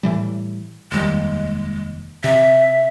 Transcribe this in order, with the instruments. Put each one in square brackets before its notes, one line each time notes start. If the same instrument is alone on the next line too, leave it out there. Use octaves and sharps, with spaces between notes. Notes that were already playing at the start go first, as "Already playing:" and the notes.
[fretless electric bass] A2 E3 G3
[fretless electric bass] F1 D#2 G3 [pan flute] G#3
[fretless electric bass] C3 [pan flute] E5